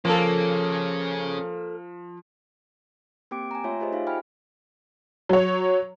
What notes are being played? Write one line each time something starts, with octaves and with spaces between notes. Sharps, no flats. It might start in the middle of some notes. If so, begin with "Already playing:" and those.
F3 A#3 C#4 G#4 A4
A#3 C4 G4 G5 D6 D7
G#5 A#5
A3 F4 C#5 E5 G#5 C6
F4 G4 G#4 C5 D#5
D#4 F4 G#4 E5 F5
G5 G#5 B5 F6
F#3 C#5